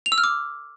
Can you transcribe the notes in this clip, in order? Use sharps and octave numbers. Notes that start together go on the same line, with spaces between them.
F7
E6
F6
D6